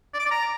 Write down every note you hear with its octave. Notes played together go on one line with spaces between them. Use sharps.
D5
D6
D5
A#5